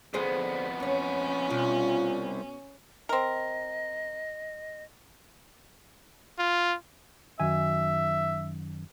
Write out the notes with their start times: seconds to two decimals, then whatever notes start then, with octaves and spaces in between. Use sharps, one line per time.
0.14 F2 D3 B3 G#4 C5
0.80 F#2 C#4 C#5
1.50 C2 B2 F4
3.09 C4 A#4 D#5
6.38 F4
7.40 F#2 D#3 E5 G#5